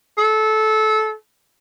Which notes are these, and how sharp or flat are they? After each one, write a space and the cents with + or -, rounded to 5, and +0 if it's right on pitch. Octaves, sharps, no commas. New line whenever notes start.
A4 -20